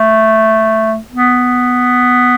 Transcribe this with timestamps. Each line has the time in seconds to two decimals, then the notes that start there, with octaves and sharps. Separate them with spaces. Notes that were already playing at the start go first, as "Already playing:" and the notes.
Already playing: A3
1.12 B3